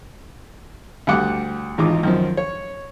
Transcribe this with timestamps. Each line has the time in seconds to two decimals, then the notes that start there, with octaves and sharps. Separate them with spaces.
1.07 D2 G3 F#5 D6
1.78 G#1 E2 D#4 F4 D6
2.03 F#2 D#3 F3
2.37 C#5